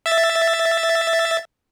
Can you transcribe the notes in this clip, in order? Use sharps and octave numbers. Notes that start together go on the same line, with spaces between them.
E5 A6